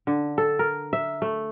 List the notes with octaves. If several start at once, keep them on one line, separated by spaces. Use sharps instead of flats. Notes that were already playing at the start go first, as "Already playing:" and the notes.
D3
A4
A#4
E5
A3